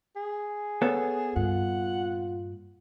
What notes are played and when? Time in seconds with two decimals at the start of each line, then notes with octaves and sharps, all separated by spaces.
0.16 G#4
0.82 B3 A4 C#5
1.36 G2 A#2 F4 F#5